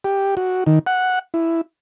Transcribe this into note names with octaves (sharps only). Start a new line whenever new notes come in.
G4
F#4
D#3
F#5
E4